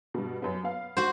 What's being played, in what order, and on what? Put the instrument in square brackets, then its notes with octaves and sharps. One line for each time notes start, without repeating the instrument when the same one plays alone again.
[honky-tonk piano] G2 B2
F#2 B3
B3 F5
[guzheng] F#4 C5